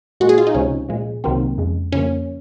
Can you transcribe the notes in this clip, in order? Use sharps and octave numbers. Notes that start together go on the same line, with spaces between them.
A#2 G#3 F#4
G#4
F4
D#4
C#2 C3 F3 G#3 C#4
A#2 F3 G#3
C2 C3 D#3 F#3 A#3 C4
F2 C#3 G#3
F2 C#3 F3 A#3 C#4